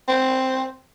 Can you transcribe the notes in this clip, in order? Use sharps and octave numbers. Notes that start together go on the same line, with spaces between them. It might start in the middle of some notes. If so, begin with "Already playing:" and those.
C4